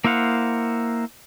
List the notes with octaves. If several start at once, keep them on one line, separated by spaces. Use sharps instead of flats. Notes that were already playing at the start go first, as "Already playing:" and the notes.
A#3 E4 C5 F5 F#5